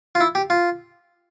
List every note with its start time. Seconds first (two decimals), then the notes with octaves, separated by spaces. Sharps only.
0.15 F4
0.20 E4
0.35 G4
0.50 F4